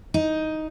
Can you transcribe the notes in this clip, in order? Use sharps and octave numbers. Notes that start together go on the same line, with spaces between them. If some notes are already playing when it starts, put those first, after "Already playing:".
D#4